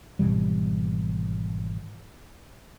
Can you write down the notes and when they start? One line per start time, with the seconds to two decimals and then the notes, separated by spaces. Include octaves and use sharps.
0.19 G#1 B2 E3 G3